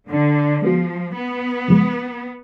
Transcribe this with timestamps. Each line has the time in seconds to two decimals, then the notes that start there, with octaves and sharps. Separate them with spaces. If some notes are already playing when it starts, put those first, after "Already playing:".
0.09 D3
0.62 F3 G#3 B3 F#4
1.15 B3
1.68 F#2 C#3 F3 G#3